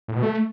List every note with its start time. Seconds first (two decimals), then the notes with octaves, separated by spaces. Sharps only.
0.08 A2
0.15 B2
0.23 A3